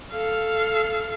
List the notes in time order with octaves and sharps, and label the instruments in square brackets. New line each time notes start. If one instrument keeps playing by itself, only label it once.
[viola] A4 F5